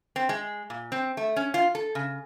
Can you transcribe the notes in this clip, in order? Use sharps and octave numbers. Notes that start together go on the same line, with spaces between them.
C4
G#3
A#2
C4
A3
C#4
F4
A4
C#3